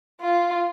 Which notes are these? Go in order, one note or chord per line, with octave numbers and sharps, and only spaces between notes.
F4